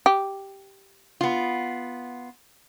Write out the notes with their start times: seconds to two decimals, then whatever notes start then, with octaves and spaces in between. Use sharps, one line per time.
0.06 G4
1.21 B3 F4